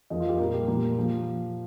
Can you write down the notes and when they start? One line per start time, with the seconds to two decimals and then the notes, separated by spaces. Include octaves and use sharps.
0.10 F2 F3 A#3 D#5
0.20 F4
0.29 G4
0.39 A#2 G3 A#3 A#4
0.54 G4
0.67 A#2 F3 A#3 G4
0.98 F3